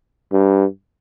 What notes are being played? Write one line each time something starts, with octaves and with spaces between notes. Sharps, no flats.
G2